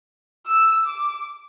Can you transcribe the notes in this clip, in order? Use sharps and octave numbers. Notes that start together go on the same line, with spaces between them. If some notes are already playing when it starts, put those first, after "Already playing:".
E6
D6